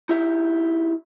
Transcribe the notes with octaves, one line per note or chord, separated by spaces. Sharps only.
D#4 E4 G4 E5